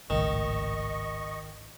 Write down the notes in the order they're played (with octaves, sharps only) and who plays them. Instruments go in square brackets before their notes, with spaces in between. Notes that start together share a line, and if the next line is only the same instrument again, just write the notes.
[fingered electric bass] G#1 C#2 A2 [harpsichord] D#3 [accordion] D#5 C#6